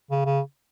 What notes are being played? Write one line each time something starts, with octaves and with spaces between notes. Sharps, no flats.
C#3
C#3